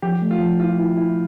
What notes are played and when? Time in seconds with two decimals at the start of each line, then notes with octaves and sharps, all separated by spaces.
0.02 F3 G4
0.22 A3
0.31 F4
0.41 F3
0.59 E4 F4
0.79 E4
0.97 E4